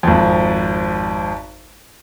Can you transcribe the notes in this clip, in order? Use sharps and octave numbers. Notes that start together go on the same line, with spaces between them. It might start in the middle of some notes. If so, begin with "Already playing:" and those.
G#1 F2